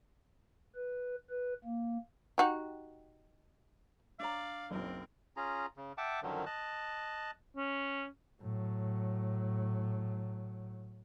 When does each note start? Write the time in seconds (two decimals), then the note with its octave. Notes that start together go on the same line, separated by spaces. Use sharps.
0.75 B4
1.30 B4
1.65 A#3
2.38 D#4 F#4 G4
4.20 D4 C#5 D5 F5 A#5
4.71 F#1 B1 C4 A#4
5.37 C#4 F4 G#4 A#5
5.77 C#3
5.98 E5 F#5 G5 A5 D6
6.22 F#2 D3 D#3 F3 F#3
6.46 D#5 A5 F#6
7.56 C#4
8.41 A2 F#3